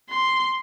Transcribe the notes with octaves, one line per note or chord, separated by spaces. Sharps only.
C6